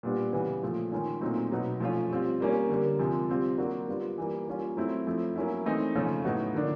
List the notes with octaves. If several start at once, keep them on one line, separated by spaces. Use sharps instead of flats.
A#2 G3 B3 D4
C#3 E3 G3 B3
A#2 F3 A3
D#3 G#3 C#4 F4
A#2 F#3 A3 C4 D#4
B2 F#3 B3 D#4
F3 A3 C#4 F4
G3 C4 F4
G3 A#3 C#4
D3 G3 A#3
C3 F3 G#3
G3 C4 F4
F#3 A#3 D4 F#4
G3 B3 D4 F4
E3 G3 A#3
G3 A#3 C#4 F4
F#3 A3 C4 E4
F3 A3 C4 E4
F#3 A#3 C#4 E4
E3 A3 C4 D#4
C#3 F3 A3 C#4 F4
A2 F#3 B3 D#4 F#4
D3 F3 A#3 D4